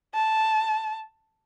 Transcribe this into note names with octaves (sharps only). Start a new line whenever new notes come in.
A5